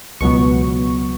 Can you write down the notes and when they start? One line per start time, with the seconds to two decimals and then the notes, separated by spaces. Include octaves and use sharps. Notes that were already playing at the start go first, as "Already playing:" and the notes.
0.21 C#2 B2 F#3 B3 C#6